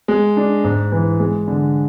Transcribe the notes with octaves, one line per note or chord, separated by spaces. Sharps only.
G#3
D4
G#2
E3
G#3
D3